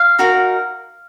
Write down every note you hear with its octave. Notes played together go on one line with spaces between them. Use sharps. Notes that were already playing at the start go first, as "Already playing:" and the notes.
Already playing: F5
D#4 F#4 A#4